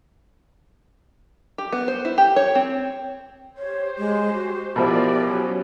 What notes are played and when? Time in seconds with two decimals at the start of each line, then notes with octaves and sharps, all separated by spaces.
1.58 G4
1.72 B3
1.88 C5
2.05 E4
2.18 G4
2.36 C#5
2.55 C4
3.57 G4 C5 C#5
3.98 G#3
4.34 F#4
4.76 B2 F3 E4 G4 A#4 D5
5.24 F#3 C#4